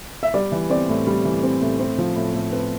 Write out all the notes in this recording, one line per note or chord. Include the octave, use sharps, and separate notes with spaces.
E5
G3 D5
E3
C4 D5
A2
G3
E3
C4
A2
C4
F3
A2
A2
C4 B4